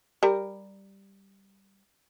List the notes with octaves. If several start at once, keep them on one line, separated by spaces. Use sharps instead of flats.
G3 A#4